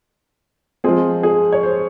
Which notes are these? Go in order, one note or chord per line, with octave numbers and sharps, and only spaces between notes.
F3 G#3 C4 G#4
G#4
C#5
C5